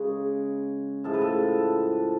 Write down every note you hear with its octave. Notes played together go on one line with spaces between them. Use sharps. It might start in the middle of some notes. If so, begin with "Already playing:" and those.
Already playing: C#3 G#3
A2 F3 G#3 A4
B4
A4